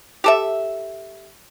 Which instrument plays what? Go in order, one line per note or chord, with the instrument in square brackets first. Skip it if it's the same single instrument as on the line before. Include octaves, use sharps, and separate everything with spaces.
[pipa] G4 A4 E5